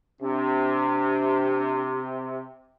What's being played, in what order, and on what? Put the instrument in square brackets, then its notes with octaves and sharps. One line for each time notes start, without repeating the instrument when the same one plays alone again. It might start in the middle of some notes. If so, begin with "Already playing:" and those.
[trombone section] C3 [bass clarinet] D4